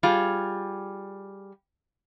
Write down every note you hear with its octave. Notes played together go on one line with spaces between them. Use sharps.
G3 F4 G#4